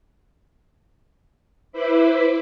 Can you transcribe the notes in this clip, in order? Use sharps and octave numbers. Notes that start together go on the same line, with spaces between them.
E4 B4 C5 E5 B5 D6